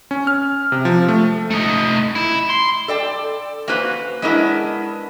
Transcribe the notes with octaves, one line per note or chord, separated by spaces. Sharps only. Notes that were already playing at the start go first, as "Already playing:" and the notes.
C#4
F6
C3
F3
A3
A3 D#4
E4
C6
A4 D5 G5
A#3 C#4 F#4 B4 C5
G#3 B3 C#4 D4 E4 A#4